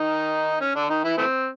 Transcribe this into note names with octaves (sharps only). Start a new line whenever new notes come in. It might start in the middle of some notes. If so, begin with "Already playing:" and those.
Already playing: D#3 D#4
C#4
D3 D4
D#3 D#4
E3 E4
E3 A3 C4